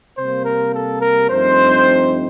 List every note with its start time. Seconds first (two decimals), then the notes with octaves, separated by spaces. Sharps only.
0.18 C3 G3 A#3 C5
0.46 A#4
0.74 A4
1.02 A#4
1.30 G2 F3 A3 C4 D#4 C5